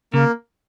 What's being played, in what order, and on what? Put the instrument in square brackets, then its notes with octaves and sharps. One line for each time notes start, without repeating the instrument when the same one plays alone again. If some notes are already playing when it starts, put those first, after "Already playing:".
[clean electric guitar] C#3 [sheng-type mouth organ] A#3